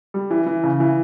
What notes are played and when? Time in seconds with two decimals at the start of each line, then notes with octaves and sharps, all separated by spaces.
0.14 G3
0.30 E3
0.46 E3
0.64 C#3
0.80 E3